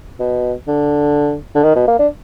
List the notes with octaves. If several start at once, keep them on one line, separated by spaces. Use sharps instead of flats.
B2
D3
D3
D#3
B2
A#3
D4